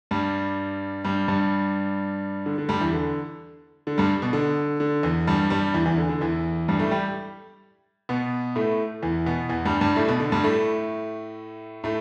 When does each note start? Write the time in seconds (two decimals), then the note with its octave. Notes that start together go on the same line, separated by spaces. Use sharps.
0.11 G2 G3
1.05 G2 G3
1.28 G2 G3
2.46 D3
2.58 D3
2.69 G2 G3
2.81 E2 E3
2.93 D3
3.87 D3
3.98 G2 G3
4.22 B2
4.33 D3
4.80 D3
5.03 E2 E3
5.27 G2 G3
5.50 G2 G3
5.74 E2 E3
5.86 E2 E3
5.98 D3
6.09 D3
6.21 E2 E3
6.68 G2 G3
6.79 A2 A3
6.91 G3 G4
8.09 B2 B3
8.56 A2 A3
9.02 E2 E3
9.26 B2 B3
9.49 E2 E3
9.65 G2 G3
9.81 G2 G3
9.96 A2 A3
10.08 B2
10.20 D3
10.32 G2 G3
10.44 A2 A3
11.84 A2 A3